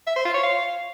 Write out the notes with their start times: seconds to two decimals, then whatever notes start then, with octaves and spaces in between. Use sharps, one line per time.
0.07 E5
0.16 C5
0.25 F4
0.34 C#5
0.43 F5